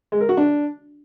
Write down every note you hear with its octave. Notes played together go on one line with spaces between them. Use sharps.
G#3
A#4
F#4
D4